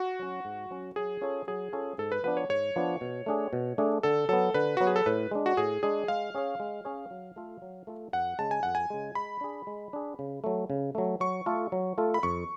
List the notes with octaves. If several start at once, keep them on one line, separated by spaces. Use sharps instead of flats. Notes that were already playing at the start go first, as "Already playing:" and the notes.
Already playing: F#4
F#3 C#4
G#2
F#3 C#4
F#3 G#4
C#4 F4 A4 C#5
F#3 G#4
C#4 F4 A4 C#5
G#2 A4
B4
F3 B3 D4 B4
C#5
G#2 C#5
F3 B3 D4
B2
A3 D4 G#4
B2
A3 D4 G#4
D3 A4
F#3 B3 A4
D3 B4
F#3 B3 F#4
G#4
A4
A2 B4
G#3 D4
F#4
A2 G#4
G#3 D4 G#4
G#3 F5
C#4 G#4 C#5
G#3
C#4 G#4 C#5
F#3
A3 F4 A4
F#3
A3 F4 A4
F2 F#5
C#3 G#3 A5
G#5
F2 F#5
G#5
C#3 G#3
G#3 B5
D4 G#4
G#3
D4 G#4
C#3
F#3 A3
C#3
F#3 A3
F#3 C#6
A3 F4 A4
F#3
A3 F4 A4
B5
F2 C#6